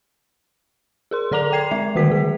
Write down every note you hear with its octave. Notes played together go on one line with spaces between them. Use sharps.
G#4 A#4 C6
D3 A4 D5 A#5 D6 F7
G5 G#6 C7 F7
G#3 E5
D3 D#3 A#3 F#4 B6
D3 G#4